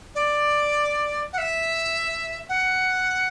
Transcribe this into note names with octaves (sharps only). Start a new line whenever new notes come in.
D5
F#5
E5
F#5